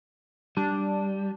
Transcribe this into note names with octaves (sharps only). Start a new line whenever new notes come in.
G3 D4